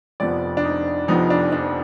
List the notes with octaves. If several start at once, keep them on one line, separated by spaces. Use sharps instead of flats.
F1 F2 F3 B3 D5
D4
D#4
F1 F2 F3 B3 D#4
D4
D4